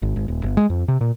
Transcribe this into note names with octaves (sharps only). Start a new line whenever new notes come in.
G#1
G#1
D#1
G1
G#3
F2
C3
A#2